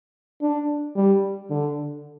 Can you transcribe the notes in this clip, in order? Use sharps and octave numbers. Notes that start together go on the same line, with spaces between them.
D4
G3
D3